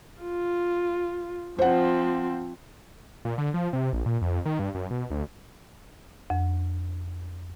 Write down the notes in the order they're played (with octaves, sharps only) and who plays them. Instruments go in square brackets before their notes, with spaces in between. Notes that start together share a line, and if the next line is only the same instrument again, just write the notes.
[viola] F4
[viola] F3 C4 [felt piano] C5 F#5
[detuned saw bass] A#2
D3
F3
C3
A#1
A#2
F2
D#3
G2
F#2
B2
D2
[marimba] F2